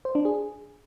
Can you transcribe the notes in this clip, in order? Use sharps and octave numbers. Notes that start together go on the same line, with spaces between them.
C5
D4
G#4